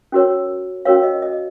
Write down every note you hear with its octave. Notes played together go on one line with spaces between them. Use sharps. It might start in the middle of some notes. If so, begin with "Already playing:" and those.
C#4 F#4 A#4 C#5
C#4 F#4 A#4 C#5 F5
D#5
D#5